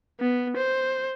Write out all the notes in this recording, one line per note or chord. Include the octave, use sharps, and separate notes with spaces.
B3
C5